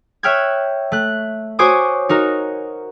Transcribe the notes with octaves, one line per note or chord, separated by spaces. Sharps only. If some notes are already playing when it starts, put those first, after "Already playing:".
C#5 E5 G5 F6 F#6 G#6
A3 F#6
F#4 C5 C#5 G#5 D6 D#6
D#4 F#4 A#4